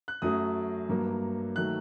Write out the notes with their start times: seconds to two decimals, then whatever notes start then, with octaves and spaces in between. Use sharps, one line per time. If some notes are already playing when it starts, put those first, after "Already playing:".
0.08 F#6
0.22 F#2 F#3 A3 D#6
0.89 G2 F#3 A#3
1.56 D#3 F#3 A3 F#6